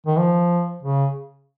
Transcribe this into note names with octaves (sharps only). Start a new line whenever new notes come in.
D#3
F3
C#3